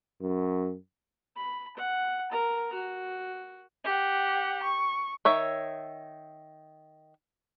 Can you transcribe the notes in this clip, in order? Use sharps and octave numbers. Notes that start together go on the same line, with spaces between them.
F#2
B5
F#5
A#4 A#5
F#4
G4 F#5
C#6
D#3 C#5 E5